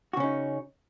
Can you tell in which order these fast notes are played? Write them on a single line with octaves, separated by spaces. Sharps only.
F#4 C#3 C#4 D#4